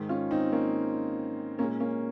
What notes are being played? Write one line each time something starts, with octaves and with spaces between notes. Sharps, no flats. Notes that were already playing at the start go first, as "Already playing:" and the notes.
Already playing: G#2 D#3 G#3
C#4 F4
C4 D#4
A#3 C#4
A#2 G#3 A#3 C#4
A#3 C#4